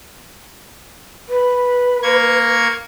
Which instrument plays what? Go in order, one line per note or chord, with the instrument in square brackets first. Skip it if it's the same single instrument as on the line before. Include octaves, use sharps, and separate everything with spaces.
[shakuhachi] B4
[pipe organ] A#3 C#6 G#6